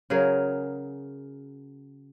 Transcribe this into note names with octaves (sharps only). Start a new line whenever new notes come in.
C#3 F#3 G#4 A#4